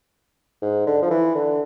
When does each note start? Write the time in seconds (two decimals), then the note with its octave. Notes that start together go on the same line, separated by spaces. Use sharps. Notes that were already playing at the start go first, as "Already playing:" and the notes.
0.62 G#2
0.87 D3
1.02 F3
1.10 E3
1.34 D3